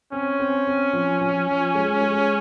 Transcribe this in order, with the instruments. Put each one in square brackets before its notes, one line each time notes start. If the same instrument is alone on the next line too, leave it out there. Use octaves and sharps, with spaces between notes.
[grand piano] C4 [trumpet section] C#4
[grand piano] C4
C4
F3
F3
F3
G#3
G#3